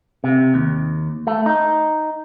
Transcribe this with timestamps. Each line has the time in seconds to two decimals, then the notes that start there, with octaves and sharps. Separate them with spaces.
0.24 C3
0.54 D#2
1.27 A3
1.46 D#4